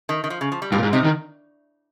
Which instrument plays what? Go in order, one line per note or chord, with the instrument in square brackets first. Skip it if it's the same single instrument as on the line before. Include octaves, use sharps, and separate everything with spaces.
[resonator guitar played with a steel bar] D#3
D#3
F3
C#3
F3
G3
[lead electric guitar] G2 [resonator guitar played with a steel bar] F4
[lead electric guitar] A#2
G#2
[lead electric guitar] C3 [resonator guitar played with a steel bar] D#4
[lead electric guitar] D#3